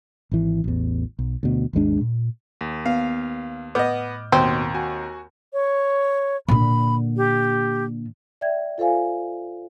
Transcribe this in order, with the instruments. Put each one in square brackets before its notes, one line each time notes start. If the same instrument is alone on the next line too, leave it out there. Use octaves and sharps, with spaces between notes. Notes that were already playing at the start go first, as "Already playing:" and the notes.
[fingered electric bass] G#1 E3
A1 E2
B1
D2 B2
G#1 D#2 G#3 D4
A#2
[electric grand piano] D#2
[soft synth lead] B3 [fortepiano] F5
[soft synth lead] A2 [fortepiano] B3 D#5 [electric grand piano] D6 F6 G6
[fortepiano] D#2 [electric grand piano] B2 [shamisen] C4
[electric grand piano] F#4 G#5
[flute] C#5
[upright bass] A#2 D3 [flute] B5
[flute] G4
[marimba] D5 E5 G5 G#6
F4 A4 C5 F5 G#5